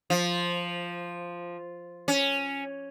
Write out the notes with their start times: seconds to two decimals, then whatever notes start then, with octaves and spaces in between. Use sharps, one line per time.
0.10 F3
2.08 C#4